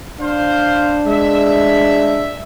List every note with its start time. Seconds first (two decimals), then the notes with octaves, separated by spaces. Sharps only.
0.20 D4 C5 F5
1.06 G#3 E5